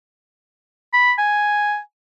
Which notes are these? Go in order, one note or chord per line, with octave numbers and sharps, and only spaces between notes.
B5
G#5